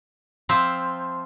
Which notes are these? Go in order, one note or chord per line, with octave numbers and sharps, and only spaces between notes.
F3 C4 F4 C5 E5